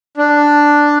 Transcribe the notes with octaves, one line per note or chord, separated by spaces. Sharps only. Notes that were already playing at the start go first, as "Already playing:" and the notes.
D4